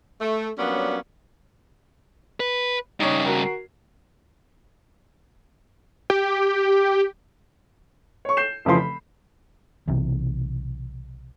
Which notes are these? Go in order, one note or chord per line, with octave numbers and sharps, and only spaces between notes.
A3
F#3 G3 A#3 B3 C#4 D4
B4
G2 C#3 D#4 C#5
F#4 A#4
G4
C#5 C#6
G6 C7 E7
F1 C#3 E3 F3 C6
B5
B1 C3 E3